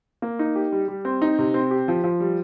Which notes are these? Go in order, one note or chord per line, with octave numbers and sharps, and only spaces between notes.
A#3
D#4
G4
G3
G3
C4
D#4
C3
C4
G4
F3
F3
G3